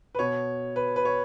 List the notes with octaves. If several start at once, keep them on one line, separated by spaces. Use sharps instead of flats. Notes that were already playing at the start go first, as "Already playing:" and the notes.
B4
B2 C#5
B4
B4
C#5